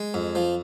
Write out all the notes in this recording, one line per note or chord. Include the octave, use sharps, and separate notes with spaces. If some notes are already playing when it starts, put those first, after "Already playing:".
Already playing: G#3
F2
F3